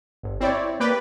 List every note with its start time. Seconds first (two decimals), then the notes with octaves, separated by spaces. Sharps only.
0.23 G1
0.41 C4 E4 C#5 D5
0.80 A#3 G4 B4 D5 G5